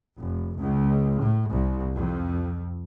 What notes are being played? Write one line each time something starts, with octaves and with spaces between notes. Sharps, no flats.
F1
C#2
A2
C2
F2